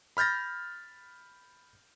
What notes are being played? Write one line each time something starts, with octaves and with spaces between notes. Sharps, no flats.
B5 F6 G6 A6 A#6